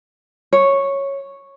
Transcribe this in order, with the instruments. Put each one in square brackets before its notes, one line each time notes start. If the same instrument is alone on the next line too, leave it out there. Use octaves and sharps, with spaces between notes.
[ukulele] C#5